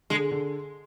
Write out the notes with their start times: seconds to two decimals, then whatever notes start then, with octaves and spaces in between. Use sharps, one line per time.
0.10 D3 G#3
0.31 D3